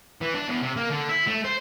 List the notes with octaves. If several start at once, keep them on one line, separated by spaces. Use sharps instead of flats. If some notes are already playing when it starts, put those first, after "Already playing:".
E3
D4
E2
C3
A#3
D3
E4
A3
C5